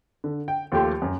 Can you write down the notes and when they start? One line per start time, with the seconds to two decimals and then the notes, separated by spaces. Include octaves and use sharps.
0.24 D3
0.48 G5
0.72 D#2 F3 A3 G4 G5 C6
1.02 F#2